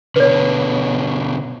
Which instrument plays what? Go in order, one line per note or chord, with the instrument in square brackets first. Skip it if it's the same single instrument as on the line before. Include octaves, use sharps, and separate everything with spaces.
[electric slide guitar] B2 D3 [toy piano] B4 C#5